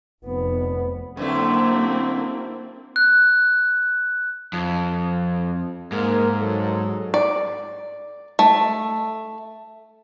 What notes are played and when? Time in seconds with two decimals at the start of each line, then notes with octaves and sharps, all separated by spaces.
0.24 F1 B3
1.17 F#2 D3 A3 A#3 C4 E4
2.96 F#6
4.53 F2
5.92 G#2 A#3 A#4
6.38 F#3 A4
7.14 D5
8.39 A3